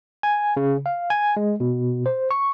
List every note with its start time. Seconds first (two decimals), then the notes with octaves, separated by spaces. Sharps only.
0.23 G#5
0.57 C#3
0.86 F5
1.10 G#5
1.37 G#3
1.60 B2
2.06 C5
2.31 C#6